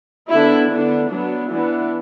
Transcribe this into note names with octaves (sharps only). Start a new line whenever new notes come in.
D3 B3 D4 E4
D3 B3 D4
F#3 B3 D4
E3 B3 D4